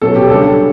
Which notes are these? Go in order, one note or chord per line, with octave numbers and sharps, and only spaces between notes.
B2 F#3 C#4 A4
G4
C#3 G3 D4 A4